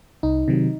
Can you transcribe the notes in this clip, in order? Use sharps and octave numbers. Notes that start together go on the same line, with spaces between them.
C2 D#4
C3 D#3 F#3